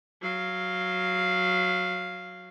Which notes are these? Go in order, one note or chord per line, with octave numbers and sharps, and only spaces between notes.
F#3 F5